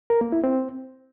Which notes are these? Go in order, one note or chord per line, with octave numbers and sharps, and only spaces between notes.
A#4
A#3
E4
C4